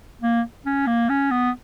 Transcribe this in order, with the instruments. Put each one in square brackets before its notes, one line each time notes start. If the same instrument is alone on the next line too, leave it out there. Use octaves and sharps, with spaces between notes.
[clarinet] A#3
C#4
A#3
C#4
B3